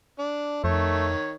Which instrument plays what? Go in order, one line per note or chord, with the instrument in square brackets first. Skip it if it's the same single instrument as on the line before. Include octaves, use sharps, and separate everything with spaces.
[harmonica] D4
[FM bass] F2 [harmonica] D#3 C#5 [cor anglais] A3